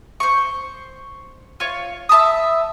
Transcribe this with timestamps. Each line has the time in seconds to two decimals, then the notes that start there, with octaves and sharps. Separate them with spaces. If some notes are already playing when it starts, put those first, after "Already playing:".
0.20 C5 C#6
1.60 F4 C#5
2.09 E5 A5 B5 D#6